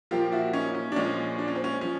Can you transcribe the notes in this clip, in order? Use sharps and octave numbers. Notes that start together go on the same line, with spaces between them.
A#2 F3 A#3 F4 G4
E4 F#4
C#4 D#4
C#4
D4
A#2 F3 G#3 C#4
D4
C#4
C4
C#4
F3 C#4